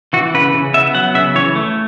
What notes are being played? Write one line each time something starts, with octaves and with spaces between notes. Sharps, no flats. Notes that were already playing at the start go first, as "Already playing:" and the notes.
E3 F#4
C#3 B4
C#3
B3 E5
F#3 F#5
C#3 E5
E3 C#5
A3